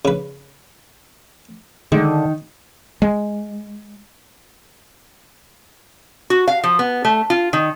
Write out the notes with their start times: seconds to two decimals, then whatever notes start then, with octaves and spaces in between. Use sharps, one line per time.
0.05 C#3 B4
1.92 D3 D#3 G#3
3.02 G#3
6.30 F#4
6.48 F5
6.64 F3
6.79 B3
7.05 A3
7.30 F4
7.53 D#3